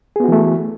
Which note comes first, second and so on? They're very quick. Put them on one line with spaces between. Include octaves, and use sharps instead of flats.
G#4 B3 F#4 E3 A3